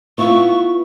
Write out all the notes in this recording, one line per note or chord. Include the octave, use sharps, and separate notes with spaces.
B3 E4 F4 C#6